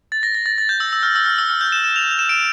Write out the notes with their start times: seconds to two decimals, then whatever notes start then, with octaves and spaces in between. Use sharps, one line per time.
0.12 A6
0.23 A#6
0.35 A#6
0.46 A6
0.58 A6
0.69 G6
0.80 E6
0.93 E6
1.03 F6
1.15 E6
1.26 F6
1.38 E6
1.49 F6
1.61 G6
1.72 E7
1.84 E7
1.96 F7
2.11 F7
2.19 E7
2.29 D7